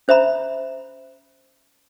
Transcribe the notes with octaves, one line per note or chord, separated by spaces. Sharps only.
C#4 C5 E5 A#5 B5